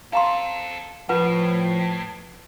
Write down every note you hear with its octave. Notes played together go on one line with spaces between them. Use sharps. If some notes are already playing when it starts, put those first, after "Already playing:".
C4 A4 F5 A#5 C6
A2 F3 F4 B4 F#5